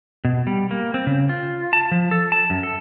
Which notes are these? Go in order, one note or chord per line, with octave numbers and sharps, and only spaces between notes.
B2
G3
A#3
C4
C#3
F4
A5
F3
A4
A5
F#2
A4